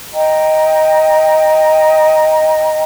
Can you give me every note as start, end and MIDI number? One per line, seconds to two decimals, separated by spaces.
0.13 2.84 75
0.13 2.84 79
0.13 2.84 82